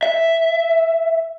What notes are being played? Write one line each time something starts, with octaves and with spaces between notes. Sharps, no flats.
E5